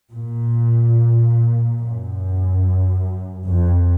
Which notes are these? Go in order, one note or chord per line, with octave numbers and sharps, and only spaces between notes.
A#2
F#2
F2